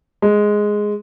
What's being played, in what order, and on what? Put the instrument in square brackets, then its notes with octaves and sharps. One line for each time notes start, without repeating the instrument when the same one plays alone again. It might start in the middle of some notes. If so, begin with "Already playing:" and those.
[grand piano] G#3